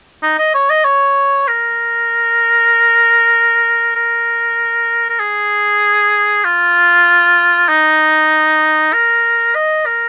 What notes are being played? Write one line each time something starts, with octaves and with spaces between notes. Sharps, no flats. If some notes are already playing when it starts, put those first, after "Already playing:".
D#4
D#5
C#5
D#5
C#5
A#4
A#4
A#4
G#4
F4
D#4
A#4
D#5
A#4